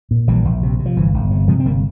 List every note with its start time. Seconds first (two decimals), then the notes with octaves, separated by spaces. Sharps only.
0.11 A#2
0.28 A#1 E3 G3
0.45 A#1
0.63 C3
0.79 C3
0.86 F3
0.96 G1 E3
1.14 G1
1.31 C3
1.48 C3 F3 G#3
1.60 C4
1.65 G1 G3 A#3